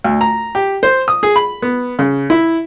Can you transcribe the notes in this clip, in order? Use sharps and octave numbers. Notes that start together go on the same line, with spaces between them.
D2
A#5
G4
C5
D#6
G#4
B5
B3
C#3
E4